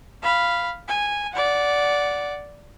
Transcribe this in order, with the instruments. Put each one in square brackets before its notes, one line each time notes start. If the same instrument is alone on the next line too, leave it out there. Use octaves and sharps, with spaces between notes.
[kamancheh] F5 B5
G#5
D5 F#5